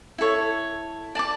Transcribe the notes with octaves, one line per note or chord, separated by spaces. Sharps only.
E4 A4 C#5
D5 A5 D6